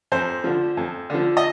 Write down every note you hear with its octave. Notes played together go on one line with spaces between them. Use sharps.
F2 C5
D3 F3
F2
D3 F3
D#5